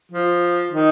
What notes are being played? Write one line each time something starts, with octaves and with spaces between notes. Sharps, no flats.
F3
D#3